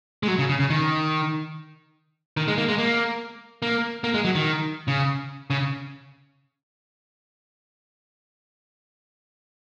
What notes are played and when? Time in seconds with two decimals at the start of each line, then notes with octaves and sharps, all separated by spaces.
0.23 G#3
0.28 F#3
0.39 C#3
0.49 C#3
0.60 C#3
0.70 D#3
2.37 D#3
2.48 G#3
2.58 A#3
2.69 G#3
2.78 A#3
3.62 A#3
4.04 A#3
4.14 G#3
4.25 F#3
4.35 D#3
4.88 C#3
5.50 C#3